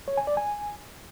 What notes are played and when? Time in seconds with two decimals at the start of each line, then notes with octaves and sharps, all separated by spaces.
0.08 C#5
0.17 G#5
0.27 D5
0.37 G#5